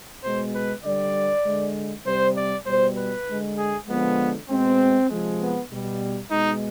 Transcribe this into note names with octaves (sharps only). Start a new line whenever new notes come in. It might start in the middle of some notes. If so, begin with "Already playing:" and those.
B2 G#3 C5
B4
D3 G3 D5
D3 G#3
C3 G3 C5
D5
B2 G3 C5
B4
D3 G#3
G#4
D3 F3 G#3 B3
B2 G#3 C4
C3 F3 G#3
B3
B2 G3
B2 G#3 D#4